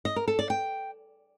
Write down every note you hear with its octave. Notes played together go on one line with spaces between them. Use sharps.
D#5
A#4
A4
D5
G5